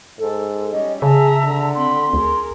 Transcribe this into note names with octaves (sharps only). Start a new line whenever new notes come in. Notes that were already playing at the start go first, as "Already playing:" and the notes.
G#2 A4
G3 C#4 D#5
C#3 G#4 E5 A5 A#5
D3
C4 B5 C6
D2 G#4 A#4